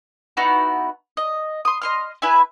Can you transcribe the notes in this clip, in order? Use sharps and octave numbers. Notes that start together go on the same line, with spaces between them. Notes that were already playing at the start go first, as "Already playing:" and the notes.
B3 D#4 E4 F#4
D#5
C6 D#6
D#5 C6 F6
E4 B4 E5 G#5